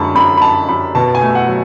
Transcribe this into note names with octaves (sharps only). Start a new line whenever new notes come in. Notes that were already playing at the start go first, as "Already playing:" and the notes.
Already playing: F#2 D3 G#3 A5 B5 C#6
F#2 B5
B5
F#2 A5
F#2 B5
B2 A5
G#5
A3
F#5
F#3